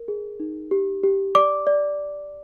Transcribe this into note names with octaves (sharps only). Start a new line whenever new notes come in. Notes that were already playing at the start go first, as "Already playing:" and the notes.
Already playing: A#4
G#4
D#4
G4
G4
D5 D6
D5